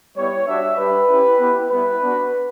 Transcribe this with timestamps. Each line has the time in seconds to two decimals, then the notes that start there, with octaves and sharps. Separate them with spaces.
0.16 G3 B3 E4 C#5
0.47 G3 D4 F#4 E5
0.78 G3 D4 G4 B4
1.09 C#4 E4 G4
1.39 B3 E4 G4
1.70 G3 B3 E4 B4
2.00 B3 D4 F#4